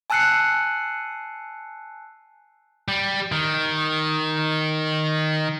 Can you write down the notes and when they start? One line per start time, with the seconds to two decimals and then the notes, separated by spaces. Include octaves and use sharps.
0.10 G#5 A5 E6 F#6 C7 C#7
2.88 G3
3.32 D#3